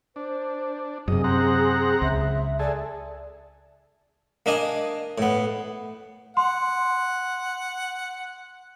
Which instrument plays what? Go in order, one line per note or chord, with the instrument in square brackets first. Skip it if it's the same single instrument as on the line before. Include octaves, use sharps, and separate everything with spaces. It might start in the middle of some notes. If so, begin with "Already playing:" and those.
[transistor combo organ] D4 [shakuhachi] C5
[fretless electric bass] F#2 C3 [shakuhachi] G#4 [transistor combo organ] D#5
[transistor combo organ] C4 F#5 A#5
[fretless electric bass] C#2 [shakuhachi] E5
[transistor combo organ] G#4 A4 [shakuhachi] D5
[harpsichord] A#3 D4 D#5 G#5
A2 B3
[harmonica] F#5 [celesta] C6